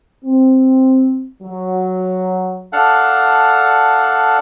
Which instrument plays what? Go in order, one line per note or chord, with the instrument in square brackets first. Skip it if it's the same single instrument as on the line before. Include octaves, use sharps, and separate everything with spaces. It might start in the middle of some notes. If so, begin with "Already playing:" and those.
[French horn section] C4
F#3
[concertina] D4 A4 F5 F#5